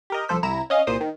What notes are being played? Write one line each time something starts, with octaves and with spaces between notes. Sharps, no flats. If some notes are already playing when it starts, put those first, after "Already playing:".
G4 A#4 D#5
C2 F3 A4 C5 B6
C2 E4 A#5 E7
C#4 D#5 F5
C2 A#2 C5 D#6
D#3